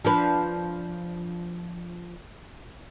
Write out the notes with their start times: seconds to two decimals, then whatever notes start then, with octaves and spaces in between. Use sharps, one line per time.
0.05 F3 D4 B4